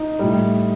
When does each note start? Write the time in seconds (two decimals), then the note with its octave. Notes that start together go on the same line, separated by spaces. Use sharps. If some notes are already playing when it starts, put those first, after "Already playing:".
Already playing: D#4
0.19 A2 G3